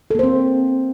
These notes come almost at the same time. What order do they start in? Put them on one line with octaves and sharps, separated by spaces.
A4 A#3 C5 C4